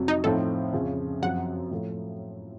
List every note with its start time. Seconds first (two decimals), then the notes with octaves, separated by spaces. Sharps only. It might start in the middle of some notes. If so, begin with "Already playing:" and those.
Already playing: F2 C3 F#3
0.08 D#4
0.24 A2 F3 C4 D#4 A4
0.73 F2 C#3 F3
1.22 F#2 F3 C4 F4 F#5
1.71 A2 F3 A3